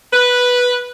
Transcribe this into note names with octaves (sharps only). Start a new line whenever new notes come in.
B4